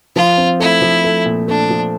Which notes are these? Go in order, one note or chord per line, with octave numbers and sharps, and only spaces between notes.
F3 F4
C4
A3 E4
F3
A3
A#2
A3 D4
F3